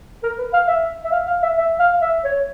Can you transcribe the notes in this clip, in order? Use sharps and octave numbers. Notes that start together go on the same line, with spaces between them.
A#4
B4
F5
E5
E5
F5
F5
E5
E5
F5
E5
C#5